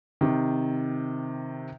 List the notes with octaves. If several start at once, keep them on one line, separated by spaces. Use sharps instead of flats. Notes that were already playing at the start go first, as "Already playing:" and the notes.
C3 D#3